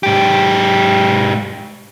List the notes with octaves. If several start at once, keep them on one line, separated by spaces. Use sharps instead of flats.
G#2 G4